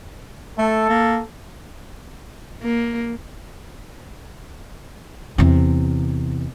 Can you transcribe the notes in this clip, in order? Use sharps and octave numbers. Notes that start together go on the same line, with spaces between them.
A3 A4
A#3
A#3
E2 C3